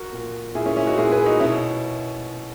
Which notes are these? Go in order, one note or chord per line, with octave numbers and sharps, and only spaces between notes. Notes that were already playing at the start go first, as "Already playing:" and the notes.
Already playing: F#4 A#4
A#2
A#2 E4 G#4
C#4 E4
C#4 E4
D#4 F#4
A#2 E4 G#4
G#4 B4
D#4 F#4
B2 C#4 E4